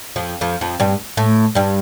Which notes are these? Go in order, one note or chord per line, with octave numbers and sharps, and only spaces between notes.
F2 F3
F2 F3
F2 F3
G2 G3
A2 A3
G2 G3